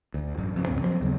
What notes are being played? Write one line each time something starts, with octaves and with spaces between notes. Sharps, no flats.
D2
A1 F#2
F2 C#3
C#2 F#2 A2 C4
F3 F#3 G#3 C4
D#2 C#3 F#3 B3